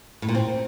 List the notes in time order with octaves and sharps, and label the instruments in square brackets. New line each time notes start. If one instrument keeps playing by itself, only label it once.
[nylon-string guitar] A2
A#2
C4